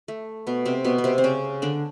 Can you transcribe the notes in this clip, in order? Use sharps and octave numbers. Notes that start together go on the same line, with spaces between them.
A3
B2 B3
C3 C4
B2 B3
B3
C3 C4
C4
C#3 C#4
D3 D4